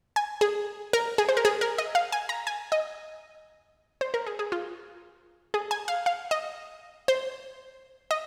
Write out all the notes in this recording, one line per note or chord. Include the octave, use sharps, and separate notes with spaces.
G#5
G#4
A#4
G#4
C5
A#4
G#4
A#4
D#5
F5
G#5
A#5
G#5
D#5
C5
A#4
G#4
G#4
F4
G#4
G#5
F5
F5
D#5
C5
D#5